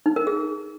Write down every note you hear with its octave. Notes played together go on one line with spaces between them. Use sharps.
D#4
A#4
G#4